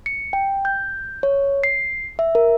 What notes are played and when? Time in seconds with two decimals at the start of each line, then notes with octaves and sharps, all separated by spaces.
0.06 C#7
0.33 G5
0.65 G6
1.23 C#5
1.63 C7
2.19 E5
2.35 A#4